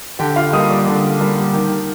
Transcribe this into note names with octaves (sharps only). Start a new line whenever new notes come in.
D3 G4 G5
F4 F5
G3 A#3 D#5 D#6
D5 D6
D3
G3 A#3
D#3